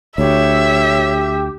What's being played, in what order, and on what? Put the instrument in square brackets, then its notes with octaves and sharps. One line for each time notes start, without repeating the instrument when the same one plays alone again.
[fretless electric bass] D2 [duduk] G4 [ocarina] C#5 [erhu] E5